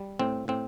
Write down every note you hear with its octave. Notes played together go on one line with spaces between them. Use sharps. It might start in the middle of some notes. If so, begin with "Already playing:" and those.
Already playing: G3
A2 C4
A2 C4